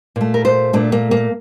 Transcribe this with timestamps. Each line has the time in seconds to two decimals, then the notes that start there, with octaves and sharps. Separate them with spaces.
0.16 A#2 A3
0.34 A#4
0.45 C5
0.73 A#2 A3 D4
0.92 A#3
1.11 A#3